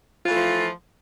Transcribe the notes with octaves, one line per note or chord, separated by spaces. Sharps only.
E3 F3 A3 F4